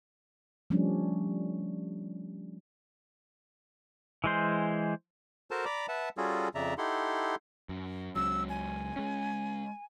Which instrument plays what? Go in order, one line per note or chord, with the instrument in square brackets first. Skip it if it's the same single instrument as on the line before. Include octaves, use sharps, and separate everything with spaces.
[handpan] F3 G3 A3 C#4 D4
[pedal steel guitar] E3 G#3 C5
[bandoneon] F#4 A4 A#4 C5 A5
D5 A#5 B5 D6
B4 E5 F#5 A5
G3 C#4 F4 F#4 G#4 A4
F2 C#3 D5 E5 A#5
D#4 E4 G4 A4 F#5 C6
[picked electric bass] F#2
[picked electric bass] C#2 C#3 F#3 [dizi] E6
[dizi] G#5
[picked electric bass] G#3 C#4